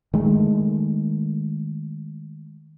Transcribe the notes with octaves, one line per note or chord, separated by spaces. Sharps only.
D#3 G#3 A3